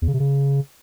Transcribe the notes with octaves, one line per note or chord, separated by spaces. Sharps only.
E2
C#3
C3
C#3